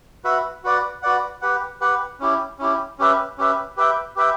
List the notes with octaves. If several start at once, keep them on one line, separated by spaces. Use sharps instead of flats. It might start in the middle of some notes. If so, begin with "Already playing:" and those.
F#4 B4 E5
F#4 B4 D5 F#5
F#4 B4 D5 F#5
G4 B4 F#5
G4 B4 F#5
C#4 E4 G4
C#4 E4 G4
C#4 G4 B4 E5
C#4 G4 B4 E5
G4 B4 E5 G5
G4 B4 E5 G5